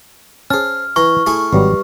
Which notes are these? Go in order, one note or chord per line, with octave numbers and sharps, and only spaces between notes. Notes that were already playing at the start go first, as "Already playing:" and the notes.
C#4 G#4 C5 A5 F6
E3 A#5 C#6
A3 E4 G#4
G#1 G2 F#3 G3